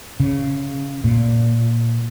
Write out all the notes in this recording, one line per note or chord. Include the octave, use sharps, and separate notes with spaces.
C#3
A#2